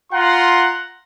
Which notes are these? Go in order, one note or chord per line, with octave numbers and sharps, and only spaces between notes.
F4 F#5 A#5 C6